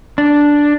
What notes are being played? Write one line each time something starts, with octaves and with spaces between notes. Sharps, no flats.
D4